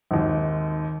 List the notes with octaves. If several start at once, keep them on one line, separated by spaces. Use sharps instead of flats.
G#1 D#2